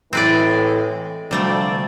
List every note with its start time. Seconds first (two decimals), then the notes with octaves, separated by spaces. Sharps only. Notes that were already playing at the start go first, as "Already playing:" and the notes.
0.13 A2 E3 G#3 C4 B4 D5
1.31 D2 C3 F3 G3 A3 D5